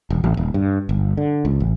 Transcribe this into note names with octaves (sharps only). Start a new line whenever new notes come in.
E1
A1
D#1
G2
G1
D3
C#2
A1